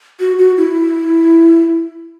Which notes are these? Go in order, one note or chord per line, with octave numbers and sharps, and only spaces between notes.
F#4
F#4
E4